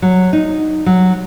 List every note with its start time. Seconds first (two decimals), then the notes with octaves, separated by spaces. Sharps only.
0.02 F#3
0.33 D#4
0.86 F#3